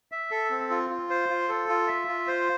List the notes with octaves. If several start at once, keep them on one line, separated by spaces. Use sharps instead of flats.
E5
A4
C4
F4
F4
C5
F4
A4
F4
E5
F4
C5